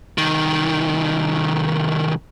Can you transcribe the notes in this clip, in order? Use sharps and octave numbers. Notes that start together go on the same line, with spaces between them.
C2 D#3